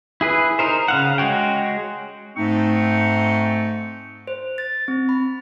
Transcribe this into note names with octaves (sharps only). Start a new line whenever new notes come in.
E4 G#4 B4
D#4 A#4 C5
C#3 F5 F#5
G#3 F#4 C#5 G5
G#2 A3 C4 D#4 C#6
C5
A6
C4
B5